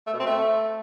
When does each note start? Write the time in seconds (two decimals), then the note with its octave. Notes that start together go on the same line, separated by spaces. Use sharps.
0.07 A3
0.13 B2
0.20 C4
0.26 A3